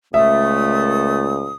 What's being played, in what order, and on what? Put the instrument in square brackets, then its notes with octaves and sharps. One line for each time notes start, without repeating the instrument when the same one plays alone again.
[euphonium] C#2 [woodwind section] A#2 A3 [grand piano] E5 [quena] D#6